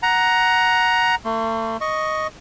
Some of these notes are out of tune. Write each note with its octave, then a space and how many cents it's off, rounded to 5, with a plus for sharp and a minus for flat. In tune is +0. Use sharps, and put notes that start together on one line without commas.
F#5 +0 A#5 +10
A3 +40 C6 +0
D#5 +0 C#6 +5